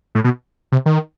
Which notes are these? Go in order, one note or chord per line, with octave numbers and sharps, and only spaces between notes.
A2
B2
C3
D#3